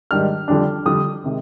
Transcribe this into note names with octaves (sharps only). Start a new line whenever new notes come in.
G#2 D#3 G3 D4 F6
F2 D3 G3 D4
F2 D3 G3 D4 D#6
C3 D#3 G#3